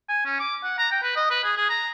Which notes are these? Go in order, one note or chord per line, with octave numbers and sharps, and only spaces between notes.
G#5
C#4
D6
F#5
A#5
G5
B4
D#5
B4
G#4
G#4
A#5